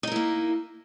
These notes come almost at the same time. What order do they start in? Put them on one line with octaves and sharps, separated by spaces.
D#4 A#4 E4 A#3